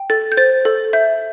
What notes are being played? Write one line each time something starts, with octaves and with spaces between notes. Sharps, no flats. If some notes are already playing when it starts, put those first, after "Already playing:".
Already playing: G5
A4 A6
G6
C5 A6
A4
E5 G6